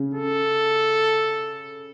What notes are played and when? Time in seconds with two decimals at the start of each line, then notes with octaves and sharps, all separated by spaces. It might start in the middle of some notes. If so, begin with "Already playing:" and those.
Already playing: C#3 C#4
0.14 A4